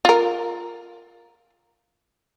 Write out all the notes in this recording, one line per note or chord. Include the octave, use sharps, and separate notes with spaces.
F4 A#4